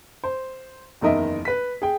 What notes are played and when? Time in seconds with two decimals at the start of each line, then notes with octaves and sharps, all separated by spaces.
0.24 C5
1.01 F#1 E2 D#3 A#4 D#5 E5
1.45 B4 B6
1.82 G#4 G5